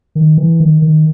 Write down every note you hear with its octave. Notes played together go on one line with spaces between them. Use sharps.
D#3
E3
D#3
D#3